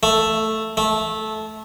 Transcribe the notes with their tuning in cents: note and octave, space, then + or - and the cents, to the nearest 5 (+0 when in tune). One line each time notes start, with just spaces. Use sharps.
A3 +0
A3 -15